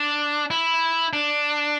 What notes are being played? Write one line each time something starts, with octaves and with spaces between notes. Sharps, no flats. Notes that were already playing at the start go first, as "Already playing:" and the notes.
Already playing: D4
E4
D4